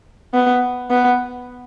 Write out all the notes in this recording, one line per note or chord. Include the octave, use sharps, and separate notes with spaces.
B3
B3